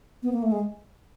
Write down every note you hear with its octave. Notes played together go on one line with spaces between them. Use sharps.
B3
A#3
A3
G#3